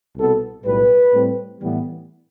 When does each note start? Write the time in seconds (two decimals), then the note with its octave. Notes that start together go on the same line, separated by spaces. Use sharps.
0.16 C2 B2 B3 A4
0.65 B1 A2 G3 B4
1.13 A2 G3 C4
1.61 A2 E3 G3 B3